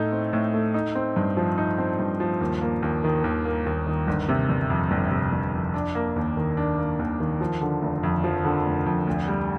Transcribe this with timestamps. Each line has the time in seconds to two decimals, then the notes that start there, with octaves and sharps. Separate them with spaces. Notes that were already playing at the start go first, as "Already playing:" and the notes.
Already playing: A2 A3 D#4
0.12 C4
0.33 A2
0.54 A3
0.74 D#4
0.95 C4
1.16 G2
1.37 F3
1.58 D#4
1.78 C4
1.99 G2
2.20 F3
2.41 D#2
2.62 A#3
2.82 D#2
3.04 D#3
3.24 D#2
3.45 A#3
3.66 D#2
3.87 D#3
4.07 G1
4.29 C3
4.49 G1
4.70 F2
4.91 G1
5.11 C3
5.32 G1
5.53 F2
5.74 D4
5.95 A#3
6.16 D#2
6.37 D#3
6.57 D4
6.78 A#3
6.99 D#2
7.20 D#3
7.41 F3
7.61 D3
7.82 F1
8.03 F2
8.24 F3
8.45 D3
8.66 F1
8.86 F2
9.07 D2
9.28 G3